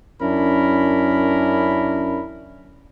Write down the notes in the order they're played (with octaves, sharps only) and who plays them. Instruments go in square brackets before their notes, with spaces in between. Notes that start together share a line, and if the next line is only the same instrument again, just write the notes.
[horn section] F#2 C#4 D4 E4 A#4 B5